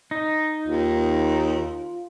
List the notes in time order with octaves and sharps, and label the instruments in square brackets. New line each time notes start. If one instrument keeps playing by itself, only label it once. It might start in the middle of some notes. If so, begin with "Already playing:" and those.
[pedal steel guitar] D#4
[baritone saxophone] D#2 [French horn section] F4